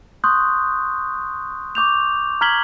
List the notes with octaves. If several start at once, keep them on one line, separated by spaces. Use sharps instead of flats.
C6 C#6 D#6 F#6 G6
C#6 D6 G6 F7
A#5 F6 G#6 B6 F#7 G7